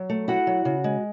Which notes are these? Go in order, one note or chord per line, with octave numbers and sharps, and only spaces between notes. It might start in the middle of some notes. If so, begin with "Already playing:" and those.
Already playing: F#3
A3
E4 F#4 F#5
F#3
C#3
G#3